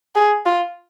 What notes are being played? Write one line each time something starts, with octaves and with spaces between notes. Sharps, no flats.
G#4
F4